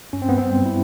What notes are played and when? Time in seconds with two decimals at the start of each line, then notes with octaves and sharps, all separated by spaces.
0.13 G2 C#4
0.22 C4
0.29 G2 B3
0.38 C4
0.45 G3
0.61 G3 E4